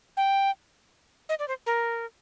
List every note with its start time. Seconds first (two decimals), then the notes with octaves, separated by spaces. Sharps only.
0.17 G5
1.29 D#5
1.39 D5
1.48 C5
1.66 A#4